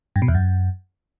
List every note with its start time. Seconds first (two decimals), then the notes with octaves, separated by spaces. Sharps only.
0.16 G2
0.22 B2
0.28 E2
0.35 F#2